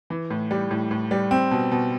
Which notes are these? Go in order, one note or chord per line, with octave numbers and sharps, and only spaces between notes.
E3
A2
G3
A2
A2
G3
C4
B2
B2